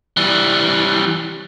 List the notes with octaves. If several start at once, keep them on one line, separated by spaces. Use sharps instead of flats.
E3 G3